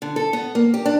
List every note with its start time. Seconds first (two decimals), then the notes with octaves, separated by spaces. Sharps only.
0.02 D3
0.16 A4
0.33 B3
0.55 A#3
0.74 G4
0.86 D4